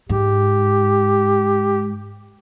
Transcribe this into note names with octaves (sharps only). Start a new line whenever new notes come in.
G#2 G4